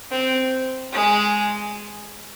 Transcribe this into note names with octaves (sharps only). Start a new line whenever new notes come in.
C4
G#3